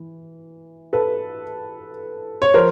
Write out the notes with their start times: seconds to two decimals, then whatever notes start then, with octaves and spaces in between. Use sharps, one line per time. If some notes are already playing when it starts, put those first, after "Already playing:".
Already playing: E3
0.93 A4 B4
2.42 C#5
2.54 F3 A#4 C5